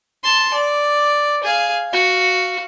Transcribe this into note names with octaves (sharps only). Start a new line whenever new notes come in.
A5 C6
D5
G#4 F5
F#4 F5